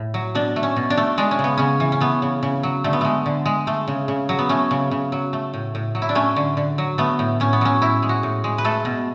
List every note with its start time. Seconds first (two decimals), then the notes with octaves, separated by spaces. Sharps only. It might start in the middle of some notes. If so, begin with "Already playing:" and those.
Already playing: A2
0.14 F#3
0.35 B2 D4
0.56 A3
0.63 C#4
0.76 B2
0.90 D4
0.97 A3
1.18 G#3 D4
1.31 C#4
1.39 C#3
1.44 B3
1.58 C#3 C#4
1.80 E3
1.92 C#4
2.01 A3 B3
2.22 C#3
2.43 C#3
2.63 F#3
2.84 D3 A3
2.93 B3
3.01 G#3 A3
3.26 D3
3.46 G#3
3.67 A3
3.88 C#3
4.08 C#3
4.29 F#3
4.39 B3
4.49 A3 C#4
4.71 C#3
4.91 C#3
5.12 F#3
5.33 A3
5.54 A2
5.75 A2
5.95 F#3
6.02 E4
6.09 D4
6.15 A3 C#4
6.36 D3
6.57 D3
6.78 F#3
6.98 A3 B3
7.19 A2
7.40 A2 C#4
7.53 B3
7.61 F#3 C#4
7.82 A2 E4
8.02 G#3
8.09 F#4
8.23 A2
8.44 G#3
8.58 B4
8.65 A3 A4
8.85 B2